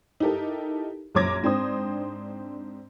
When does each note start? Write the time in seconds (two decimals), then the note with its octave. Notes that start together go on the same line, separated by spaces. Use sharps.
0.20 D#4 E4 G4 A4 A#4
1.15 A#1 F#2 C#5 D6 G#6 A#6
1.43 G#2 C4 D4 C5 D#6